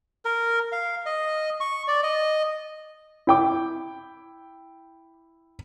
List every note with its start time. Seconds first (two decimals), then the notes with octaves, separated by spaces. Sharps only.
0.25 A#4
0.72 F5
1.06 D#5
1.60 C#6
1.88 D5
2.03 D#5
3.27 E4 G5 D6